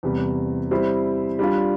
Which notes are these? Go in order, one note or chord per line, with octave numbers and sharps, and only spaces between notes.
E2 C3 G3
G3 C4 E4 G4 C5
G3 D4 F4